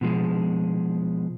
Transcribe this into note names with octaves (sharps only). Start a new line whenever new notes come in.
B2 F3 G#3